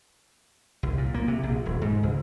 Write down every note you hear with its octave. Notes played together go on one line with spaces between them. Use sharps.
C2
A#2
A#3
C3
A#1
D#1
G#2
C#2